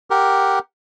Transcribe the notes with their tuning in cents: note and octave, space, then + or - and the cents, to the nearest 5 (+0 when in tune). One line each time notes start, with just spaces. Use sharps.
G4 +0 A#4 +0 F#5 +0